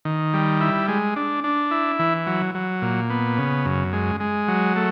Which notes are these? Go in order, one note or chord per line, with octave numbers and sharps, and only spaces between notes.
D#3
G3
E4
G#3
D4
D4
E4
E3
F#3
F#3
A#2
B3
C#3
F#2
G#3
G#3
F#3
A3